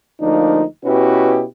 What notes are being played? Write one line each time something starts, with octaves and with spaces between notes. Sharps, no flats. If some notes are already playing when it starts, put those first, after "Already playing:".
D2 F3 A#3 D4 D#4
B2 C#4 E4 F#4 G4 B4